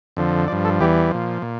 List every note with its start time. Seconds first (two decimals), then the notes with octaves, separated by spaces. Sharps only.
0.17 F2 D3 F3
0.48 G2 F3 D5
0.65 A4
0.80 E2 E3 G3 G4
1.11 A#2 F3
1.42 A#2